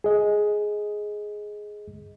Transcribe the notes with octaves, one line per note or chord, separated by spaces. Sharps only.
G#4 D#5